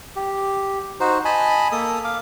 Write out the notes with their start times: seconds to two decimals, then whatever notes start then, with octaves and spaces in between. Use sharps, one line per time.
0.16 G4
1.00 D#4 F#4 C5
1.25 D#5 G#5 A5 B5
1.72 A#3 A4 D#6
2.04 F5 D6